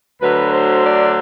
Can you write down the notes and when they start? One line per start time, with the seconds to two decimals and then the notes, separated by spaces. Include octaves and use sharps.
0.22 D2 D3 F#3 B4
0.52 C5
0.85 D5